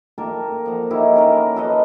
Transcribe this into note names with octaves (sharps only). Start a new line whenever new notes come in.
A#3 A4 A#4 G5
F3 F#5
D#4 E4 G4 C#5
C#4 E4 A#4
F#4 A4 B4 D#5